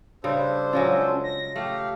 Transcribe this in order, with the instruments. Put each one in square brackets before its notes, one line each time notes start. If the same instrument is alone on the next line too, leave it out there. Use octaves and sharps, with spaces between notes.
[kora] C#3 G3 [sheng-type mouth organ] D4 A4 C5
[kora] F#3 G#3 F4 [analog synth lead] C#4
[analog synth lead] A#6
[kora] A3 [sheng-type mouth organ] G4 F5